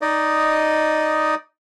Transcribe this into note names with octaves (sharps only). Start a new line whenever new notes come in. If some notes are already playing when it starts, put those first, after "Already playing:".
D#4 D5 D#5